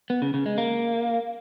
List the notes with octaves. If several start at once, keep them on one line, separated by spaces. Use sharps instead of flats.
B3
C#3
C#3
G#3
A#3